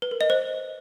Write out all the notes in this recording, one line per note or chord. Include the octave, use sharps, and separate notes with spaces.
B4
A#4
D#5
C5